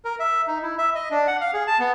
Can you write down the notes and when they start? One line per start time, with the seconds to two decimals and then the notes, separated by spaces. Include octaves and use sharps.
0.05 A#4
0.20 E5
0.48 D#4
0.62 E4
0.78 E5
0.95 D#5
1.11 D4
1.27 F#5
1.41 F5
1.54 G#4
1.67 A5
1.79 B3